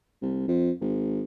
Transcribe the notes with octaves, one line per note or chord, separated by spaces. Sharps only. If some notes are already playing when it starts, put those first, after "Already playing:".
C2
F2
G#1